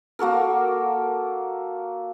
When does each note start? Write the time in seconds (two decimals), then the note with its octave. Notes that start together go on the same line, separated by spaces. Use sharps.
0.19 A#3 F#4 A4 A#4